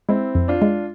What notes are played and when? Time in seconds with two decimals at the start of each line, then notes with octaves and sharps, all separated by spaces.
0.09 G#3 C4 E4
0.35 F2
0.48 D4 F4
0.62 G#3